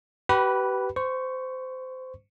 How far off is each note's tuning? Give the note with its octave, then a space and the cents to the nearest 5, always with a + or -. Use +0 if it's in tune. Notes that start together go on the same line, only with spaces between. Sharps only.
G4 -35 B4 +0 B5 -20
C5 -20 C#6 +0